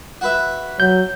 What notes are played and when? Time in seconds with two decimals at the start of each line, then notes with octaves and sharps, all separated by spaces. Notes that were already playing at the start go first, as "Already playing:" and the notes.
0.21 F#4 B4 E5
0.80 F#3 G6